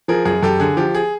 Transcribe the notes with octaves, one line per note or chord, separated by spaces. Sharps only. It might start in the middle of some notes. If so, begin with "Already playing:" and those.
F3 G#4 A#4
F#2 G#4
F#2 G4 A4
D3 G#4
F3 G4
G#4